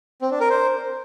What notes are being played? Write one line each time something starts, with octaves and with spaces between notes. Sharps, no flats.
C4
D4
A#4
C5